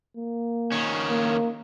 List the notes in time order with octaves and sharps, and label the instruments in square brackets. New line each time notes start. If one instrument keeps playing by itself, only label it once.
[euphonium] A#3
[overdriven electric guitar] D#3 C#4
[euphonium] A#3